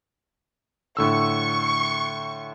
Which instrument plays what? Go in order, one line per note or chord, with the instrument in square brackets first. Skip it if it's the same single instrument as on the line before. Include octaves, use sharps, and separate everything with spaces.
[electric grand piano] A2 D3 E6 [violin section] C#6